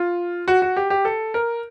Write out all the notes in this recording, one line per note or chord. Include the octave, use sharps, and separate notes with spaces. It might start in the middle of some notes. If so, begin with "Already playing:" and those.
Already playing: F4
F#4
F#4
G4
G4
A4
A#4